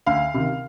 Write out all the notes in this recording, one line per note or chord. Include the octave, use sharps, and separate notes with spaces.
D2 F5
C3 D#3